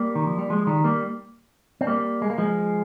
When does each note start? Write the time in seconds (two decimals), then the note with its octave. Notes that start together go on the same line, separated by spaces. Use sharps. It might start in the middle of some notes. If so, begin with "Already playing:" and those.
Already playing: G3 A#3
0.15 D#3
0.27 F3
0.38 G3
0.50 F3 G#3
0.67 D#3 G3
0.84 G3 A#3
1.81 C4
1.87 G3 A#3
2.22 G#3
2.30 A#3
2.38 F3 G#3